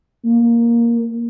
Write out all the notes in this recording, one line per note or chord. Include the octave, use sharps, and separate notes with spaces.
A#3